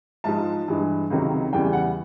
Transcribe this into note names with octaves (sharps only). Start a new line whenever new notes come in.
G#2 F3 G#3 A5
G2 E3 G#3
C#2 C3 D#3 F#3
E2 C#3 E3 G3 G5
F#5